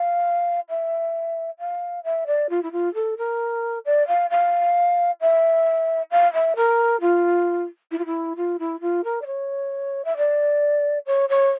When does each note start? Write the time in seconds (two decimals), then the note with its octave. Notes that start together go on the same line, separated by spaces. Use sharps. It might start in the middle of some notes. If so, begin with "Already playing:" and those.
Already playing: F5
0.69 E5
1.59 F5
2.04 E5
2.27 D5
2.50 F4
2.63 E4
2.72 F4
2.94 A4
3.18 A#4
3.85 D5
4.08 F5
4.30 F5
5.21 E5
6.11 F5
6.33 E5
6.56 A#4
7.01 F4
7.91 E4
7.99 F4
8.06 E4
8.37 F4
8.59 E4
8.81 F4
9.04 A#4
9.22 D5
9.26 C#5
10.05 E5
10.17 D5
11.06 C#5
11.29 C#5